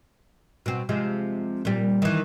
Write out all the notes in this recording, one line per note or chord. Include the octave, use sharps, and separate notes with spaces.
B2 C4
C3 F3 G#3
A#2 G3
D#3 E3